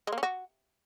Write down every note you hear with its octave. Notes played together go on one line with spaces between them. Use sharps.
G#3
A#3
C#4
F#4